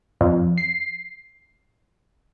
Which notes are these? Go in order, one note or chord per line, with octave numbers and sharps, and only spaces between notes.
F2
C7